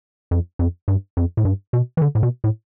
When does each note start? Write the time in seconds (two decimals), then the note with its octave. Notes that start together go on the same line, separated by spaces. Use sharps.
0.31 F2
0.59 F2
0.88 G2
1.17 F2
1.37 A2
1.45 G2
1.73 B2
1.97 E3
2.01 D3
2.15 A2
2.23 B2
2.44 A2